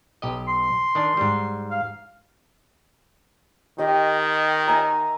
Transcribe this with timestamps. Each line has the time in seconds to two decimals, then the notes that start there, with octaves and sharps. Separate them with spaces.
0.22 B1 G4 D#5
0.48 C6
0.95 D#3 D4 G#5
1.17 G#2 G3
1.70 F5
3.78 D#3 G4 D#5 G5
4.68 E5 G#5 A#5